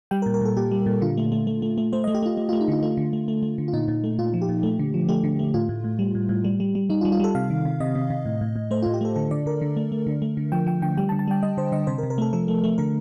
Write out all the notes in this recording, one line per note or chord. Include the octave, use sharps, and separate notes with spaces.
G3 G5
A#4
A#2
A#4
A#2 A4
A#2 G4
G3
A#2
D3 F4
A3
A3
A3
A3
A3
A3 C5
D#5
A3
G4
A3 F4
A3
F4
A3
D#4
D3 F4
A3 F4
D3
A3
A3
A3
D3
F4
A#2 D#4
A#2
A3
A#2 F4
F3
G4
A#2
A3
D3
F3
A3 G4
D3
A3
A2 F4
A2
A2
G3
A2
A2
G3
G3
G3
G3 D#4
F4
G3
F4
G3 A4
C3 F5
D#3
C3
C3 D#5
C3
C3
A2
A2
A2
A3 C5
F4
A2
G4
A3 A4
D3 A4
D3 D5
D3 A#4
D3
A3
A3
D3
A3
D3
F3 G5
F3 G5
D3 G5
G3 G5
A5
D3
A5
G3 G5
G3 D#5
D3 C5
D3 D#5
C3 C5
A#4
C3
A#4
A3 A4
F3 A4
A3
A3
D3 A#4